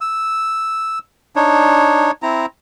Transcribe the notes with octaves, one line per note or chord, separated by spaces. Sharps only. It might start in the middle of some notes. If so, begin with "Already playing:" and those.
E6
D4 D#4 C#5
C4 E4 A#5